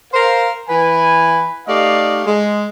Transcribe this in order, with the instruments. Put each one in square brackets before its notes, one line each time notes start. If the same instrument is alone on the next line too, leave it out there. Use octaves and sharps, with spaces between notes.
[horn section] A#4 C5 F5
E3 B4 G#5
A3 D#4 G4 D5 D#5 F5
G#3